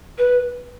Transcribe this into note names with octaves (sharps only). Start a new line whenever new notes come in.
B4